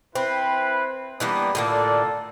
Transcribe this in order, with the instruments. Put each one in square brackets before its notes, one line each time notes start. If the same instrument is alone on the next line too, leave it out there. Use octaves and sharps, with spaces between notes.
[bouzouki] C4 [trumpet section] E4 B4
[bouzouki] E3 G3 A#3 [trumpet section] B3 D4 D#6
[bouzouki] A2 D3 A#3 [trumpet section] F4 A4 D5